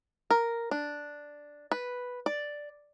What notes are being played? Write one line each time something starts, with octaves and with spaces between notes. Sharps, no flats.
A#4
D4
B4
D5